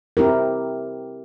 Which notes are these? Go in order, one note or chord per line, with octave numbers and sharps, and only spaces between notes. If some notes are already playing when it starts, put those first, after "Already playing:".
C4 E4 G4 A#4